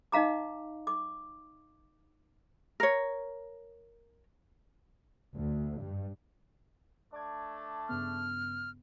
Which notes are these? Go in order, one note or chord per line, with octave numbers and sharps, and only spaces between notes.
D#4 D#5 F5 A#5 D6
D6
A#4 C#5
D2
G2
A3 D4 D5 D6 G#6
G2 C#3 B3 F6